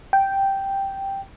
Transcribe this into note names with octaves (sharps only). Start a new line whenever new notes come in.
G5